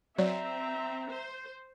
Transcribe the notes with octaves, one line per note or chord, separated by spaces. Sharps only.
F#3 C4 D5 E5 A#5
C5